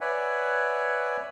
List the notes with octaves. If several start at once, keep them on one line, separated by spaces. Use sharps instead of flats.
B4 C#5 D5 E5 F#5 G#5